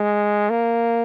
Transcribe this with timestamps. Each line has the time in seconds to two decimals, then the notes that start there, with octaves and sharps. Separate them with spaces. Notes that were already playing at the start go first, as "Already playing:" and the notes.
Already playing: G#3
0.50 A#3